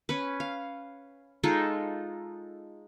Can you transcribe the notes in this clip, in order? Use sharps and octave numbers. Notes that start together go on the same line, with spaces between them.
C#4 B4
F5
G#3 D#4 F4 A4